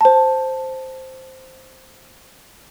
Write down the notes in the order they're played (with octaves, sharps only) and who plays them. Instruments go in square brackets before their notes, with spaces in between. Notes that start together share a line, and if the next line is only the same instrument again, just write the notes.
[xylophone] C5 A5